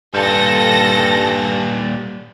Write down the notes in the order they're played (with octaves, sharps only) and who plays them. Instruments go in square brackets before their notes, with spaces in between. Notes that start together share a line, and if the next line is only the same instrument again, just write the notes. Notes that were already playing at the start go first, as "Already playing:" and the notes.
[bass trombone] G2 [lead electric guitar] A#2 G3 [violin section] A4 A#6